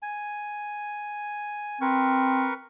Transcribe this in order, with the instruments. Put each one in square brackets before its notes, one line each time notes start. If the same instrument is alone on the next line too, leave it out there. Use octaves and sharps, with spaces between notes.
[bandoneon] G#5
[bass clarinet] C4 [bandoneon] A#4 B4 C#6